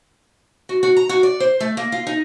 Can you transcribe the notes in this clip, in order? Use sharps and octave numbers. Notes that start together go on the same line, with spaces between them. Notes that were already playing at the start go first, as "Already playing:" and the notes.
F#4
F#4
A#5
F#4
D5
C5
A3
A#3
F4
D#4